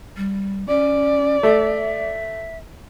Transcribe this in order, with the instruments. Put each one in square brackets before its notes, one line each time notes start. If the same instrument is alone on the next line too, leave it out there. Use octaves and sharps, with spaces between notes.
[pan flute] G3
[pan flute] C#4 [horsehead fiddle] D5
[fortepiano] A3 [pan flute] E5